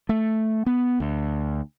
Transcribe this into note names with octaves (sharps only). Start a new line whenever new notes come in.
A3
B3
D2